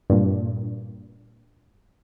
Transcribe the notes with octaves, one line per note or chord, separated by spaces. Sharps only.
G2 A#2